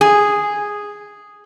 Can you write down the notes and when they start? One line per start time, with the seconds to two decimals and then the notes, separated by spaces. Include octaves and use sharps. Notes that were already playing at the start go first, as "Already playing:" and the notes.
0.01 G#4